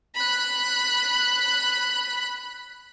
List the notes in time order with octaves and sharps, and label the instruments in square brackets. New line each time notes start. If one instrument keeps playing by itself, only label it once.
[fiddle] B5 F#6